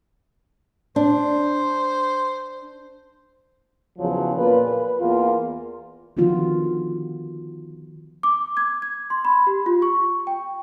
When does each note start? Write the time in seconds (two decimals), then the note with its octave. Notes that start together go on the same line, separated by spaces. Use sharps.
0.96 D4 C5
3.99 E2 C#3 F3 F#3
4.35 A#2 F4 A#4 B4
4.67 B4
5.00 E2 A#3 F4
6.17 D3 D#3 F3 B3 F4 F#4
8.23 D6
8.57 G#6
8.82 G#6
9.10 C6
9.25 B5
9.47 G4
9.66 F4
9.82 C#6
10.27 G5